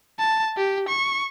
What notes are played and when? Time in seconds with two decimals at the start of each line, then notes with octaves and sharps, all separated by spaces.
0.19 A5
0.57 G4
0.89 C#6